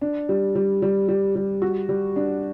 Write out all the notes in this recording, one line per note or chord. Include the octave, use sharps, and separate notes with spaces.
D4
G3
G3
G3
G3
G3
F#4
G3
D4